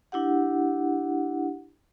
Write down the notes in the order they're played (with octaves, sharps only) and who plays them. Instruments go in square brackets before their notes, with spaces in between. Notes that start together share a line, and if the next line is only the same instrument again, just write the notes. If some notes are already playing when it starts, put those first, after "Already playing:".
[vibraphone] D4 E4 G4 F#5